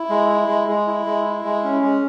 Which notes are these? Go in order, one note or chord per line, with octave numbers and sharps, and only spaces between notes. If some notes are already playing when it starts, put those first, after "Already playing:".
Already playing: E4
G#3
E4
G#3
G#3
E4
G#3
E4
G#3
C#4
G#3